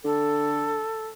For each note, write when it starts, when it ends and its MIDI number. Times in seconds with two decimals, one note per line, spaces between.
0.04 0.83 50
0.04 1.07 69